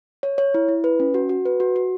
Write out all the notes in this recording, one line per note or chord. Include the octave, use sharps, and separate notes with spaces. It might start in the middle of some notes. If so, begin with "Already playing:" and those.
C#5
C#5
E4
E4
B4
C#4
F#4
F#4
B4
F#4
F#4